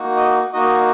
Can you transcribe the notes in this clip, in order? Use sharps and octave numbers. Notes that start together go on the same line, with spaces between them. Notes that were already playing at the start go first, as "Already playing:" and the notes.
Already playing: A#3 D#4 F#4
D#5
A#3 D#4 F#4 D#5